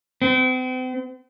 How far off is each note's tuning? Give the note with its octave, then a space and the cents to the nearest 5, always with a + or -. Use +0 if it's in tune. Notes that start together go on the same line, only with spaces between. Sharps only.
C4 -40